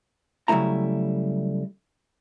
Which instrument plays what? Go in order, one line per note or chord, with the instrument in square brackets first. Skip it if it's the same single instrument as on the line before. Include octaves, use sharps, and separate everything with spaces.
[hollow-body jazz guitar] C#3 F#3 G3 A3 E4 A#5